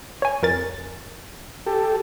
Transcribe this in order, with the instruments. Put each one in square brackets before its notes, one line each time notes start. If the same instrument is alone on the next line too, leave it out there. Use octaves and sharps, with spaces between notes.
[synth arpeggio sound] C#5 G#5
F2 A#4 A6
[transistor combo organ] G4 A4